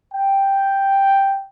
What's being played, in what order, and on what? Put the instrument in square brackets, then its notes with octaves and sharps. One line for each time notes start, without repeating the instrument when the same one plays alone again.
[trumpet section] G5